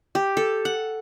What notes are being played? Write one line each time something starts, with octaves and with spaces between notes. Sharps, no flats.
G4
A4
F#5